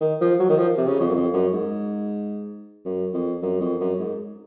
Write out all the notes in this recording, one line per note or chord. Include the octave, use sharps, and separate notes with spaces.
D#3
F3
F#3
D#3
F3
C3
C#3
F2
F#2
F2
F#2
G#2
F#2
F2
F#2
F2
F#2
G#2